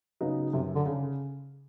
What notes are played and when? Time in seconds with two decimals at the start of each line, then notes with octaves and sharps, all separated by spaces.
0.21 C#3 F#3 B3 D#4
0.53 F#2 C3
0.76 D3
0.86 C#3